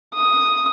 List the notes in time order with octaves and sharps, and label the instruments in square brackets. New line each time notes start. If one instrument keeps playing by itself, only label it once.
[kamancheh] D#6